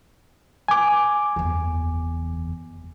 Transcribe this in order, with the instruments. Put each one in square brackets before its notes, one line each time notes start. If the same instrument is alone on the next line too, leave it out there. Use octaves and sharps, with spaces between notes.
[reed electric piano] G#5 D6
[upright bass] F#1 E2